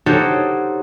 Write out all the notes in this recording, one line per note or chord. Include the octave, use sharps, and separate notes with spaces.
D#4 F#4 G4 A4 C5 C#5